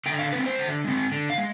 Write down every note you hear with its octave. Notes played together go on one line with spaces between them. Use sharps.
D3 G5
F5
G#3 C4 B4
C5
D3
G#3 C4
D3
F5
G#3